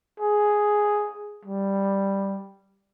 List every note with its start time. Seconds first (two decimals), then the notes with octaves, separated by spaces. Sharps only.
0.20 G#4
1.45 G3